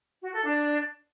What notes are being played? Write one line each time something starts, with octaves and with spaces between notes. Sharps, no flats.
F#4
A4
D4